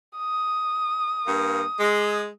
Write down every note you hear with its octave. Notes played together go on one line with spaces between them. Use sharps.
D#6
G2 A#3
G#3